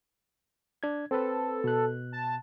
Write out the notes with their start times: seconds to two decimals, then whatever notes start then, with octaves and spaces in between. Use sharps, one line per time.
0.83 D4 G#6
1.11 C4 A4 B4
1.64 B2 F#6
2.12 A5